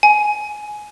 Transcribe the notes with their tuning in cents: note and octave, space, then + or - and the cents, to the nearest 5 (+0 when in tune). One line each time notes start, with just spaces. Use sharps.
G#5 +15